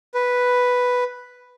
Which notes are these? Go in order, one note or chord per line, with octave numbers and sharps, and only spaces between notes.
B4